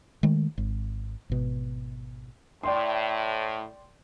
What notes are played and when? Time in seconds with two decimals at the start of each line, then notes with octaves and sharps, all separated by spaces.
0.23 D#3 G#3 A3
0.58 G#1
1.30 G#1 B2
2.63 A2 D5 G5 C6